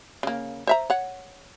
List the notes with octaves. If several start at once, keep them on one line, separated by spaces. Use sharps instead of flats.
C#3 A#3
C5 E5 A#5
C#5 F#5